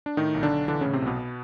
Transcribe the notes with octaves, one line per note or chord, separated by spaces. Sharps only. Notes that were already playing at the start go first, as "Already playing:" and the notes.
D4
A2 D#3 D#4
B1
D3 D4
B1
D3 E3 D4
A2 C#3 C#4
C3 C4
B1 B2 B3